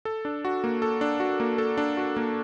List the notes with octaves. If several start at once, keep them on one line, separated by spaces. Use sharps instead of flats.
A4
D4
F#4
A#3
A4
D4
F#4
A#3
A4
D4
F#4
A#3